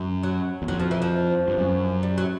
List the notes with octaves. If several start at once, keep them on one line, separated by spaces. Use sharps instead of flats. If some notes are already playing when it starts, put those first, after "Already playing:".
Already playing: F#2
F#3
E2
F2 F#3
F3
E3
F3
G2
F#2
G3
F#3